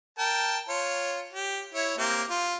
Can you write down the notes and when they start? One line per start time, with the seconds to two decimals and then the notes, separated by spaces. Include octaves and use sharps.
0.19 A#4 G5 A5
0.69 F4 C#5
1.33 G4
1.74 E4 C#5
1.98 A#3 C4 G4
2.29 F4